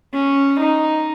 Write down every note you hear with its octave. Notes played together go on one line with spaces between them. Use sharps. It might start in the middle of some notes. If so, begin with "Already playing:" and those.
C#4
D#4